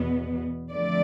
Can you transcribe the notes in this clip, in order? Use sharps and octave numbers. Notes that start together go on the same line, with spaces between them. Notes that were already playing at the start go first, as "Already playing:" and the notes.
Already playing: E2 B2 B3
F2 D3 A3 D5